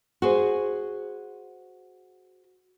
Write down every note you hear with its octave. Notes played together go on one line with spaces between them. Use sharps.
F#4 G#4 C5